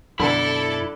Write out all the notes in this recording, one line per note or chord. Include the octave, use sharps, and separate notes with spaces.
F#2 B2 D3 E4 A4 D5 B5